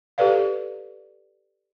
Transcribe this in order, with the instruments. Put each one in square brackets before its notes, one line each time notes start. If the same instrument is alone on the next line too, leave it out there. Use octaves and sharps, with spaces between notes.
[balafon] G4 A4 B4 D5 F5